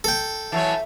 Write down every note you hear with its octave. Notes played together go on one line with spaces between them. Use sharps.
A4 G5
E3 F#3 C#5 E5 A5